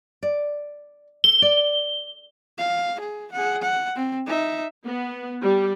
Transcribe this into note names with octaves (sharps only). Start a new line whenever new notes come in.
D5
A4 G7
D5
F5
G#4
G#4 F#5
F#5
C4
D#4 E5
B3
G3